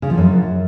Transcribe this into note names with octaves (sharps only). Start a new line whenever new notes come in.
C#3
F3
F#2